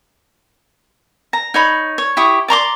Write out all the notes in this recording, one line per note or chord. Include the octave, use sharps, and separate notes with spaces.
A#5
D#4 C#5 B5
C#5
E4 G4 C#6 D#6
D5 A#5 C6 D6